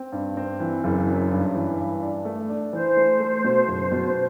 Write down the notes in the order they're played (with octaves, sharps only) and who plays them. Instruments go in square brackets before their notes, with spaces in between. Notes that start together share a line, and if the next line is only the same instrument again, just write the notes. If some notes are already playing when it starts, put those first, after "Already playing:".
Already playing: [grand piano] C4
G2
C4
E3
F#1
F#2
G2
E3
G2
D4
A3
D4
[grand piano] E3 [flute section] C5
[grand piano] A3
A3
B2
F#1
B2